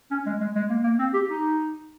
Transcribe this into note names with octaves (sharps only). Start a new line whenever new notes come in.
C#4
G#3
G#3
G#3
A#3
A#3
C4
G4
D#4